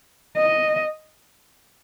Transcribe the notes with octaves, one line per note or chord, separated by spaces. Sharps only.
D#5